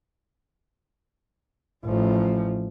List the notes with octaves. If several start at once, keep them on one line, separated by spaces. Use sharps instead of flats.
A1 F3